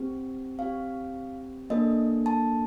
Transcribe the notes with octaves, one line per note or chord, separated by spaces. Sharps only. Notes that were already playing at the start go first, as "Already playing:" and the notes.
Already playing: C4 G4
C4 G4 F5
A#3 D4 A4 D#5
A5